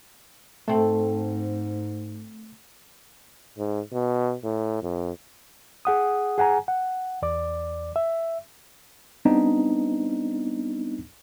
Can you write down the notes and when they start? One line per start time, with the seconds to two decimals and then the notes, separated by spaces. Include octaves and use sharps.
0.68 G#2 A3 C4 A4
3.58 G#2
3.92 B2
4.44 A2
4.82 F2
5.85 G#4 F#5 D#6
6.38 G#4 F#5 G#5 A#5
6.68 F#5
7.22 E2 D5 D6
7.96 E5
9.25 G3 B3 C4 D4 D#4